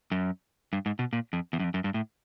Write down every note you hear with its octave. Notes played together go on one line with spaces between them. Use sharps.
F#2
G2
G#2
B2
A#2
F2
E2
F#2
F2
F#2
G2
A2